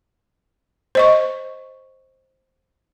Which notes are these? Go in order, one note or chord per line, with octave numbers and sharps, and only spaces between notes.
C5 D#5 C#6